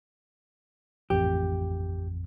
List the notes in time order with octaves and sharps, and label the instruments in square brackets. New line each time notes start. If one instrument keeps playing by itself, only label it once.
[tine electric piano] A1 F2 [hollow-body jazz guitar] G4